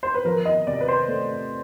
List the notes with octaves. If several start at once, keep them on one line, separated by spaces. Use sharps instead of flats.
C5
B4
F3 A#4
D#5
C3 D5
B4
C5
A3